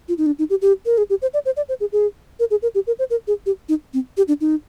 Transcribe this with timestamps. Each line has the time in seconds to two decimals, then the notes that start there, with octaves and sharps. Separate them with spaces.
0.08 F4
0.18 D#4
0.26 D4
0.39 D#4
0.50 G4
0.62 G4
0.86 A#4
0.98 G#4
1.10 G4
1.22 C5
1.34 D5
1.46 C5
1.57 D5
1.69 C5
1.80 G#4
1.92 G#4
2.40 A#4
2.51 G#4
2.62 A#4
2.75 G4
2.87 A#4
2.99 C5
3.10 A#4
3.27 G#4
3.46 G4
3.69 D#4
3.94 C4
4.17 G4
4.28 D4
4.41 D#4